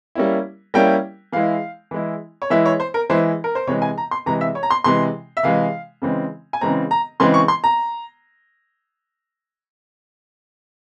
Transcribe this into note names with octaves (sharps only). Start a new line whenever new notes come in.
G3 A#3 C#4 E4
G3 A#3 C#4 E4 G5
E3 G#3 E4 F5
E3 G#3 E4
C#5
E3 G#3 E4 E5
C#5
C5
A#4
E3 G#3 E4 C5
A#4
C5
C3 E3 G#3 C#5
G#5
A#5
C6
C3 E3 G#3 A#5
E5
C#5
A#5
C6
C3 E3 G#3 C6
E5
C3 E3 G#3 F5
C#3 E3 G#3 C4
G#5
C#3 E3 G#3 C4 A#5
A#5
C#3 E3 G#3 C4 C6
C#6
C6
A#5